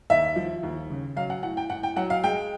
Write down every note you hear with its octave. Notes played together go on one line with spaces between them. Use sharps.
D#2 E5
F3
D#2
C#3
F#3 F5
F#5
A2 F#5
G5
A2 F#5
G5
F#3 F#5
F5
G#3 G5